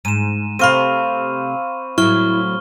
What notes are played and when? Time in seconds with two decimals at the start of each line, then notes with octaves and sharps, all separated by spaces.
0.05 G#2 D#7 E7
0.59 C3 A3 C4 F5 B5 C#6 D#7
1.98 A2 F#3 E4 C#6 F6 G7